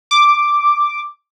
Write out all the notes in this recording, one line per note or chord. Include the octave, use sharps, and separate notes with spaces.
D6